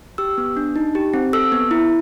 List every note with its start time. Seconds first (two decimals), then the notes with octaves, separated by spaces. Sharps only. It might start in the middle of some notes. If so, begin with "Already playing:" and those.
0.18 G4 E6
0.38 B3
0.57 D4
0.76 D#4
0.95 G4
1.14 C4
1.33 A4 E6
1.52 B3
1.71 E4